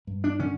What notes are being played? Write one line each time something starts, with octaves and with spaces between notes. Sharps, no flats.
G2
D4
D3 C#4